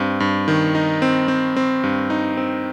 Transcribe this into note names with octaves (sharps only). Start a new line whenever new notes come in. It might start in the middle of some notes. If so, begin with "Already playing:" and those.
Already playing: G2 C4
G2
D#3
D#4
C4
C4
C4
G2
D#4
C4